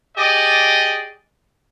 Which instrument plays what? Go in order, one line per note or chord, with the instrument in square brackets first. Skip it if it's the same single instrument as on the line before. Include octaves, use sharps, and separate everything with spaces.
[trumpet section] G4 G#4 D5 D#5